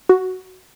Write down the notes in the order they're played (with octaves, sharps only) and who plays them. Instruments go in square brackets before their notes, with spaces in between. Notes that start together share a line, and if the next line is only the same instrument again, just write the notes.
[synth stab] F#4